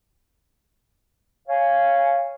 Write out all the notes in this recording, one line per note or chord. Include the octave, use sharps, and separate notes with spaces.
C#5 F5 G#5